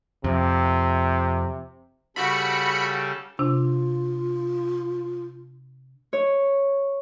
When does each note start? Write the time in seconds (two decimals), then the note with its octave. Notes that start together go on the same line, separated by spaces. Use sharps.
0.24 F2 C3
2.16 C#3 G3 F#4 A4 B5 C#7
3.39 C3 D4 F4
6.13 C#5